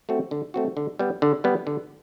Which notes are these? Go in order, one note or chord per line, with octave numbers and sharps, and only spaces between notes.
A3 C4 F#4
D3
A3 C4 F#4
D3
G3 B3
D3
G3 B3
D3